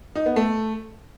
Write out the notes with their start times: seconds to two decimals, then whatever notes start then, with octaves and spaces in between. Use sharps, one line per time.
0.15 D#4
0.26 B3
0.36 A3